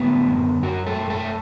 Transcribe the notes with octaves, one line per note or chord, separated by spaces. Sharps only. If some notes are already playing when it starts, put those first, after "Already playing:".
Already playing: A2 D3 B3
F#2
F#2 F#3 F#4
A3 A4
F#2
A3 A4